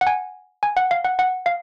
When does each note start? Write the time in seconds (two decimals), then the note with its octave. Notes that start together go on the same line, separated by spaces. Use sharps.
0.01 F#5
0.07 G#5
0.63 G#5
0.77 F#5
0.91 F5
1.05 F#5
1.19 F#5
1.46 F5